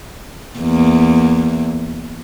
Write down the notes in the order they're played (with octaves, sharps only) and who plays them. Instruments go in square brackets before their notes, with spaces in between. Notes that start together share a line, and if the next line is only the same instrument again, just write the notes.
[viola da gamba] E2 A#3